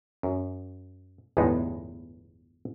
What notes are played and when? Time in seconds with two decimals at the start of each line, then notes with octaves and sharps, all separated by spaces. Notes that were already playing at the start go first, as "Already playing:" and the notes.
0.23 F#2
1.37 G1 E2 A2 G#3 B3 D#4